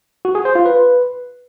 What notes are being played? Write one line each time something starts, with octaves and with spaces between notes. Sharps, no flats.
F#4
G#4
C5
F4
B4